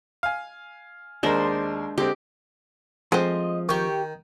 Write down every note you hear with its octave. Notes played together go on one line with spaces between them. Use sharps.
F5 G#5
D#2 G#3 D4 A#4 C5
D3 G#3 C4 G4
F3 G#3 A3 C4 D#5
D#3 G4 C#6